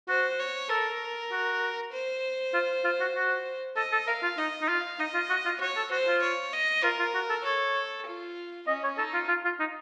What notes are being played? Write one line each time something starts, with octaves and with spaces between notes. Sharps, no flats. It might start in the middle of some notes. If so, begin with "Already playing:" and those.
F#4 C5
C#5
A4 A#4
F#4
C5
F4
F4
F#4
F#4
A4 D#5
A4
A#4 F5
F4
D#4 D#5
D#4
F4 F5
D#4 D#5
F4
F#4
F4
F#4 C#5
A4
F#4 C5
F4
C#5
D#5
F4 A#4
F4
F#4
A4
A4 C#5
F4
C#4 D#5
C#5
D#4 A4
F4
F4
F4
D#4